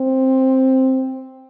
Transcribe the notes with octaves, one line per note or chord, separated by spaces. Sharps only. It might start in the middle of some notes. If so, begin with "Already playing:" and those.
Already playing: C4